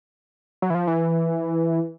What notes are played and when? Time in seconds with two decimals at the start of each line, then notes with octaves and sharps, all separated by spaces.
0.62 F#3
0.70 E3
0.75 F3
0.87 E3